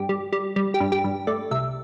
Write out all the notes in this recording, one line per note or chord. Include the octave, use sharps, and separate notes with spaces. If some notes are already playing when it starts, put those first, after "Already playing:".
Already playing: G2 G4
G3
G3
G3
G4
G2
G4
G2
A3 D5
C2 E5